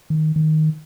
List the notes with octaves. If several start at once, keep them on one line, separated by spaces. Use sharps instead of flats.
D#3
D#3